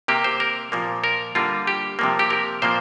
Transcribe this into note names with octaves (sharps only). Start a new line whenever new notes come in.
C3 A#3 G4
C5
A#4
A#2 F3 A#3
A#4
D3 G3 A#3 F4
G4
C3 F3 A#3
G4
A#4
A#2 F3 A#3 C5